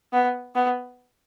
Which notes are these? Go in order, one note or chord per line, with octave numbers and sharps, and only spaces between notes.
B3
B3